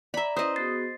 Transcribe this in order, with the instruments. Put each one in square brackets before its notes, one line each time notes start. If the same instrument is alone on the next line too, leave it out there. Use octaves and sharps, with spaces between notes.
[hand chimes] D5 A#5 [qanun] E5 B5
[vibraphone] C#4 E4 B4 [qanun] C5 D#5 [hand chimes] D#6
[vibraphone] B3 F#4 G#4 [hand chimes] A6 C7